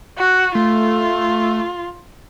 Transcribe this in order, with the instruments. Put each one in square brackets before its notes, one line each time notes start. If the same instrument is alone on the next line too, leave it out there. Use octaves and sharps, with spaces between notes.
[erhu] F#4
[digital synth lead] A3 [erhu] F4